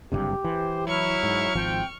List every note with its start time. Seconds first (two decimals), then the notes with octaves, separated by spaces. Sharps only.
0.12 F#1 G2 C3 G4
0.44 E3 C5
0.87 F#3 E4 C#6 F6
1.23 G#2
1.55 G#1 F3 C4 G5